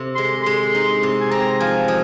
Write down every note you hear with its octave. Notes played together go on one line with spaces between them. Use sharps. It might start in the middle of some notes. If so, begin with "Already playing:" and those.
Already playing: C3
G#3 C6
G#3 C6
D#4
C3
G#5
C4 A#5
F3 G#5
F3 D#5